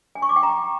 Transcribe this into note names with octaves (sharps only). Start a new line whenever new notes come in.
G#5
C#6
D6
G5
A#5